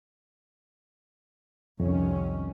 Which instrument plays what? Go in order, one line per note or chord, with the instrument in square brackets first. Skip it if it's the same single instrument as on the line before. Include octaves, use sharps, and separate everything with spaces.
[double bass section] C2 D#3 C#4 [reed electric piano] F2